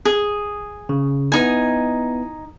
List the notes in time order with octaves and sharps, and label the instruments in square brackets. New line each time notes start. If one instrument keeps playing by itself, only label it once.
[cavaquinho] G#4
[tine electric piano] C#3
[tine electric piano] B3 E4 [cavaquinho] D#4 G#5